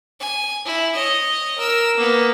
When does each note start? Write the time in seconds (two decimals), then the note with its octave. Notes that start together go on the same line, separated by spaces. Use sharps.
0.20 G#5
0.66 E4
0.94 C#5 D#5
1.58 A#4 E6
1.97 A#3 B3